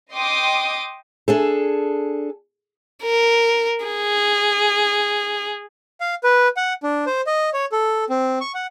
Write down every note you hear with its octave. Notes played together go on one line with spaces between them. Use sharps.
D#5 G5 C6 D6 D#6
D4 G#4 A4
A#4
G#4
F5
B4
F#5
D4
C5
D#5
C#5
A4
C4
C#6
F#5